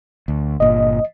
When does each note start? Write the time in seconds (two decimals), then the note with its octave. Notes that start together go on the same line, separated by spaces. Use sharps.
0.28 D2
0.60 G1 A#2 D#5